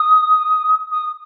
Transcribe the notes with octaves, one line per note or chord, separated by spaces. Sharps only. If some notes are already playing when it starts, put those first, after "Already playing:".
Already playing: D#6
D#6